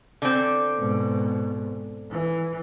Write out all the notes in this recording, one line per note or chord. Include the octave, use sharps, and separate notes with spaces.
D3 C4
G#2 B2
E3